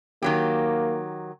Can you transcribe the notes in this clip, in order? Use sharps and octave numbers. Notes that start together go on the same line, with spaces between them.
D#3 F#3 A#3 G4